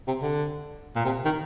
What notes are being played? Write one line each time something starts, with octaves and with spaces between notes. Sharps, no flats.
C3
D3
A#2
C3
D#3